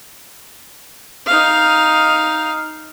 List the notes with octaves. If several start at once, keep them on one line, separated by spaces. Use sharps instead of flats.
D#4 F5